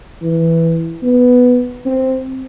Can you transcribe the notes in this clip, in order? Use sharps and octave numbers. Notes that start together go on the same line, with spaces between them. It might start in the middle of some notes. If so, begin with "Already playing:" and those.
E3
B3
C4